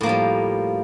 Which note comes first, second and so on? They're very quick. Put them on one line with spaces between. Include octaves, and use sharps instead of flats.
A2 A#3 F3 G3